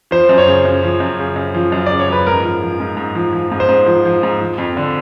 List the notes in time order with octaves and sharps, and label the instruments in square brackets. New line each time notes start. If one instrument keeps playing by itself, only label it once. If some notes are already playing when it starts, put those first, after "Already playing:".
[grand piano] F3 C5
F#2
C#5
C#3
F#2
F3
F#2
C#3
F#2
F3
F#2
C#3 D5
C#5
F#2 B4
G#2 A#4
F3
F3
G#2
G#2
F3
F3
G#2
C5
G#2
F3
F3
G#2
F3
F2
D3